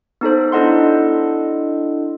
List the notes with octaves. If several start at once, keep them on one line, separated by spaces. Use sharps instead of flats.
B3 D#4 A4 C5
D4 E4 A4 D#5 F#5 C6